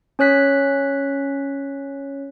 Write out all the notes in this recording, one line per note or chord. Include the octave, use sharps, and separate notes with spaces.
C#4 C#5 F#6 B6